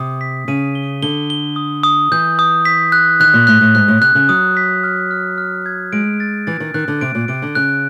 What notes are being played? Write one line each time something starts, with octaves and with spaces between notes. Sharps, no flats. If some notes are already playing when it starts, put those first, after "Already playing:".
Already playing: C3 D#6
B6
C#3 D#7
G7
D3 G7
G7
D#6
D#6
E3 G6
D#6
B6
F#6
D#3 F#6
A#2
A2 F#6
A2
G#2 F#6
A2
C3 F#6
C#3
F#3 D#6
B6
F6
F6
F6
G#6
G#3 D7
A6
E3 A6
D#3
D#3 F#6
D3
C3 D7
A#2
C3 D7
D3
C#3 F#6